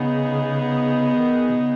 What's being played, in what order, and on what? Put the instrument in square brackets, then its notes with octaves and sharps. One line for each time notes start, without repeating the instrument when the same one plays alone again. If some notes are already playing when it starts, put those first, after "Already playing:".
Already playing: [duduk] C#3 [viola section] B3 D#4 G#4
[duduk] D#3
B2
C#3